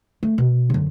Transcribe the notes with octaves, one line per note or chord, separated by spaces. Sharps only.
A3
B2
F#2 D3